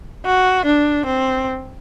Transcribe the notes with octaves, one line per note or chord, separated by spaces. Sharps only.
F#4
D4
C4